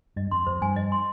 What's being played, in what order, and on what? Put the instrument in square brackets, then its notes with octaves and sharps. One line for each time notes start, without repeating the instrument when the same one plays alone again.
[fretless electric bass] G2 [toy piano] D#5
[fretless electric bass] F2 [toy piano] C6
[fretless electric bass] F2 [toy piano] C5
[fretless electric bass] G2 [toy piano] G#5
[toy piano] D#5
C6